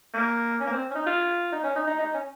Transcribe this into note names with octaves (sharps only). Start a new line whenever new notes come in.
A#3
C#4
A#3
C4
C#4
D#4
F4
D#4
C#4
D#4
D#4
D#4
C#4